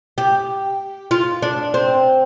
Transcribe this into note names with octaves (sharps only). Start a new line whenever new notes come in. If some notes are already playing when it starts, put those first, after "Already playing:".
G4
F4
D4
C4